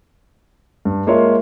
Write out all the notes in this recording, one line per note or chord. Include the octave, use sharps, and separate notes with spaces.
G2
G#3 A#3 F4 C#5 E5